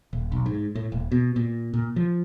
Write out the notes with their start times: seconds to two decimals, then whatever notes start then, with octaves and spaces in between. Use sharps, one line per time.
0.13 D#1
0.32 B1
0.46 G#2
0.75 A2
0.92 D#1
1.12 B2
1.36 A#2
1.74 A#2
1.96 F3